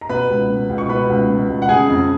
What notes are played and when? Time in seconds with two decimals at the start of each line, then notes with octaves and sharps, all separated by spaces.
0.01 A#5
0.09 B2 B4 B5
0.29 C#2
0.49 B2
0.69 C#2
0.78 C#6
0.89 B2 B4 B5
1.09 C#2
1.29 B2
1.49 C#2
1.62 F#5
1.69 C#3 G#4 G#5
1.89 F2